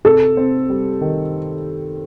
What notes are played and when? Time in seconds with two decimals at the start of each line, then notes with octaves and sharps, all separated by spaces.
0.05 C3 A4
0.37 C4
0.70 G3
1.01 D#3